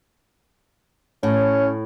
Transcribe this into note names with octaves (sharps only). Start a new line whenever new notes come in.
A2 C#4